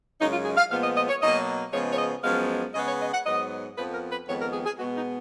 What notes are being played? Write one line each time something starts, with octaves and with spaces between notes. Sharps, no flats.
F#2 C#3 G#3 D#4
F4
G#4
F5
A#2 F3 G#3 B3 F5
D#5
D#5
C#5
B2 F#3 A#3 D#5
C#3 F3 G#3 B3 C#5
C#5
D#5
F#2 F3 G#3 B3 F5
C#3 G#3 B3 D#5
C#5
D#5
F#5
G#2 F#3 B3 D#5
F2 F3 B3 B4
A#4
B4
F2 D#3 G#3 B3 C#5
A#4
G#4
G#4
B2 G#3 B3 F#4
D#4